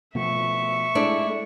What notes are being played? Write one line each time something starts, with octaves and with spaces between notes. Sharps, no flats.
B2 F3 A3 E5 C#6
G#3 A3 D4 E4